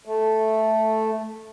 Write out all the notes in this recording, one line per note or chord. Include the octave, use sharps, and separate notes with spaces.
A3